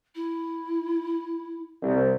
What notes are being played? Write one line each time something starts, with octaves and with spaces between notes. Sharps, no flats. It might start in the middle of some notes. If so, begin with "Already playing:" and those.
E4
C2